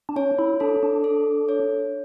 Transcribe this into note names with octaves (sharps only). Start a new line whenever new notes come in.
D4
C#4 C#5
E4
D4 A4
D4
A4
C#5